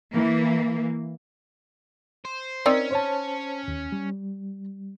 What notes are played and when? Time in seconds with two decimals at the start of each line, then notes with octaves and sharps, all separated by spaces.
0.12 E3 A#3
2.25 C5
2.66 C4 C#4 D#4 A#4 D5
2.91 C5 C#5 A5
3.68 D#2
3.92 G3